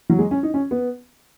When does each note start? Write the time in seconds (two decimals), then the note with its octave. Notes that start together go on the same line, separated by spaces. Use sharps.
0.10 F#3
0.19 G#3
0.31 C#4
0.43 D#4
0.54 C#4
0.71 B3